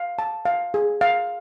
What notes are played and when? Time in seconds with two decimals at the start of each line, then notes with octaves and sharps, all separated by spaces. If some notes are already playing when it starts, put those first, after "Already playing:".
Already playing: F5
0.19 A5
0.45 F5
0.74 G#4
1.01 F5